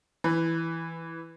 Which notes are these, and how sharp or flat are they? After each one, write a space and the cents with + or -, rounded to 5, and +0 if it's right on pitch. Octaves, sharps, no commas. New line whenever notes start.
E3 +0 B4 +15